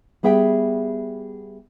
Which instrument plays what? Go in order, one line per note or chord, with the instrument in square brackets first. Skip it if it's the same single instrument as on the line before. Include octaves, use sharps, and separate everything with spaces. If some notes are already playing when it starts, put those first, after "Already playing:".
[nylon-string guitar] G3 B3 G#4 E5 G5